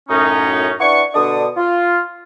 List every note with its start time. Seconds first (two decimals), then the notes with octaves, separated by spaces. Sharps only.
0.09 F#2 A2 C#4 D#4
0.80 D4 E4 B4 F#5 C#6
1.14 B2 D3 D4 D5 D#6
1.57 F4